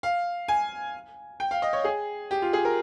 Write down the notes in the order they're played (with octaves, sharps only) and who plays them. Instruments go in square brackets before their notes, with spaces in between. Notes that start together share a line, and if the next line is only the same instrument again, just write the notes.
[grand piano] F5
G#5
G5
F5
D#5
C#5
G#4
G4
F4
G#4
A#4